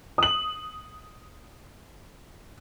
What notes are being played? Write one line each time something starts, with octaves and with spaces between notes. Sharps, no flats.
D#6 F#7